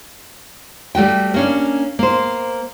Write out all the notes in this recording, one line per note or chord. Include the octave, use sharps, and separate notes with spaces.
G3 A3 F#4 G5
A#3 C#4 D4
A#3 C5